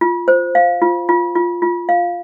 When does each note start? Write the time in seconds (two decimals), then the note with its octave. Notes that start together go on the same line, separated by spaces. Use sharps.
0.01 F4
0.28 C5
0.55 F5
0.82 F4
1.09 F4
1.35 F4
1.62 F4
1.89 F5